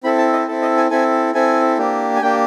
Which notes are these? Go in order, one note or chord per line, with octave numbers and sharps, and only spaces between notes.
C4 E4 A4 B5
A5
D#5
C4 E4 A4
D#5
G#5
C4 E4 A4 G#5
C4 E4 A4 G#5
A#3 D4 G4
G#5
A#3 D4 G4 G5